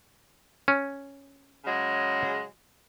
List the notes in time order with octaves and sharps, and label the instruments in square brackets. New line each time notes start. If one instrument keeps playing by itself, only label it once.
[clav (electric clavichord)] C#4
[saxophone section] C#3 F#3 G#3